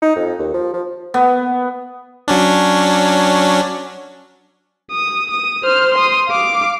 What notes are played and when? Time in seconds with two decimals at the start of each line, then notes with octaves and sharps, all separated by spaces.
0.02 D#4
0.16 F2
0.39 D#2
0.54 F3
0.74 F3
1.14 B3
2.28 F#3 C#4 D4
4.91 D#6
5.31 D#6
5.64 C5 F6
5.94 C6 D#6
6.28 F5 D6